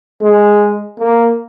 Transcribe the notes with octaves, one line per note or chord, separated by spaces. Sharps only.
G#3
A#3